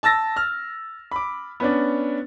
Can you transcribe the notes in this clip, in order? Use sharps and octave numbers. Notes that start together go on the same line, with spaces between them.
A5 E6 A6 A#6
F6
B5 D6
B3 C#4 D4